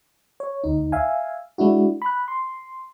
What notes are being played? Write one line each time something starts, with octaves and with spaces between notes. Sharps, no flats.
C#5
D2 D#4
E5 F5 G#5
G#3 D4 E4 F#4
B5 F#6
C6